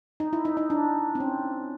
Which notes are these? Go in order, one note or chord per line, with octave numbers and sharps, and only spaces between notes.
D#4
E4
D#4
D#4
D4
C4
C#4